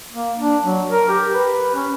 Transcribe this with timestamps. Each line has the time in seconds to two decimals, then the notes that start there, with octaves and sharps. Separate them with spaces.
0.13 A#3
0.39 D4
0.64 F#3
0.91 A#4
1.09 G4
1.34 B4
1.75 C#4